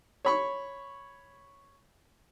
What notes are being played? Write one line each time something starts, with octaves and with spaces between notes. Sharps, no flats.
C#5 B5 C#6